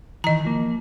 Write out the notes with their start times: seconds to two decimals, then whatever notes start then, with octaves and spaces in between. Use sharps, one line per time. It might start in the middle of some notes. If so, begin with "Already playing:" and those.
0.24 D#3 E3 D#5 A#5
0.44 F3 A#3